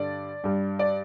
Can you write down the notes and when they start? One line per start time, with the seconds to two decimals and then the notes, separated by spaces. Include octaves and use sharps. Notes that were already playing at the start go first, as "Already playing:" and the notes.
Already playing: G2 D3 G3 D5
0.44 G2 G3
0.79 D5